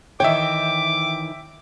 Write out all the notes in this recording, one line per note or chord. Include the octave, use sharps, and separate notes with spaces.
D#3 E3 C#5 E5 G5 D6